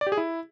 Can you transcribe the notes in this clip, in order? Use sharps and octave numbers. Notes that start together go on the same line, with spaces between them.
D5
G4
G#4
E4